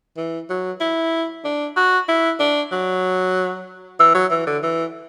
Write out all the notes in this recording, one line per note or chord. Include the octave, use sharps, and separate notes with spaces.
E3
F#3
E4
D4
F#4
E4
D4
F#3
E3
F#3
E3
D3
E3